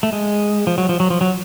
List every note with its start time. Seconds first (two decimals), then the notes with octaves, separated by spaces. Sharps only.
0.03 A3
0.13 G#3
0.67 F3
0.78 F#3
0.89 F3
1.00 F#3
1.10 F3
1.21 F#3